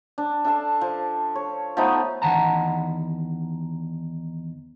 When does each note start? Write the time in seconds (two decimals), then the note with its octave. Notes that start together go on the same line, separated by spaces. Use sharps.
0.18 D4
0.44 D4 A4 F5 A5
0.81 F3
1.35 C#5
1.77 F3 A3 B3 D#4
2.22 E2 D#3 F#5 A5 A#5